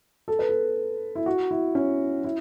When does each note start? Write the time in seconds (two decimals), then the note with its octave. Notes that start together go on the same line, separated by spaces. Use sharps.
0.28 A4
0.39 B4
0.49 A4
1.15 E4
1.26 F#4
1.51 E4
1.75 C#4
2.24 E4